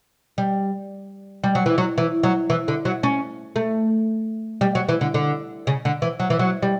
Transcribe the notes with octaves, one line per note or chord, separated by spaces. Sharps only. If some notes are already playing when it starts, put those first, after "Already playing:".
G3
G3
F#3
E3
F#3
E3
F#3
E3
D3
F#3
C#4
A3
G3
F#3
E3
D3
D3
C#3
D3
E3
F#3
E3
F#3
G3